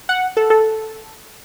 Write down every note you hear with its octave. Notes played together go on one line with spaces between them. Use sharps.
F#5
A4
A4